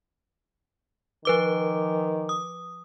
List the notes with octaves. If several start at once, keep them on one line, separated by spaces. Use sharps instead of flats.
D#3 F3 B4 D6
D#6